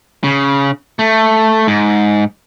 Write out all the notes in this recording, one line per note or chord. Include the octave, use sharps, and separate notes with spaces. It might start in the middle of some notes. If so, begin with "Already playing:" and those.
C#3
A3
G#2